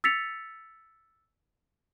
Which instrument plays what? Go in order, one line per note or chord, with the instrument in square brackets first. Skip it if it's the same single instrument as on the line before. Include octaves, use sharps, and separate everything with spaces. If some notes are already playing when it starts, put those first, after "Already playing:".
[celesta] E6 A6 B6 C#7 F7